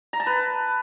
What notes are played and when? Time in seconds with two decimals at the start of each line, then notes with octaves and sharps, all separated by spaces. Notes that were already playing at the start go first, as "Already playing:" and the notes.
0.13 A#5
0.20 A5
0.26 B4